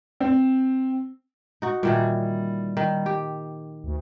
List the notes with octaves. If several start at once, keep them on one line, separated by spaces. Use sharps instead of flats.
C4
D#4 F#4
A#2 D#3 E3 G3
D#3
G4
D2